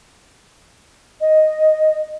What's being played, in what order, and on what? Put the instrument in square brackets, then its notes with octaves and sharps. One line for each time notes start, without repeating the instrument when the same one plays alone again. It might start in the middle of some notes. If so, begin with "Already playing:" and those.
[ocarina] D#5